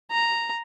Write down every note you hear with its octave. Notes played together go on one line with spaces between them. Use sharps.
A#5